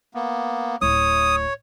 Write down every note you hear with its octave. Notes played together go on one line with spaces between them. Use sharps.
A#3 B3
D1 E4 C#5 D#6